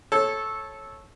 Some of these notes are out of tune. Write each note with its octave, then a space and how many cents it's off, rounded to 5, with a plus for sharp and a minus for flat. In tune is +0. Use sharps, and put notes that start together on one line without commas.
A4 -10 C#5 -15